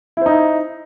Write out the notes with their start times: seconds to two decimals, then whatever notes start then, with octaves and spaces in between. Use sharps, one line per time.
0.17 E4
0.21 C5
0.26 D#4